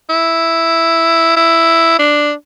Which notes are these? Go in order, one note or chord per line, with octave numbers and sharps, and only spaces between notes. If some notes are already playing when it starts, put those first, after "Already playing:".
E4
E4
D4